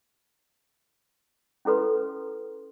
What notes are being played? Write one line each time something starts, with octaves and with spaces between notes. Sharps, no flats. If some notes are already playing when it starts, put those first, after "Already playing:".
C#4 E4 A4 B4 C6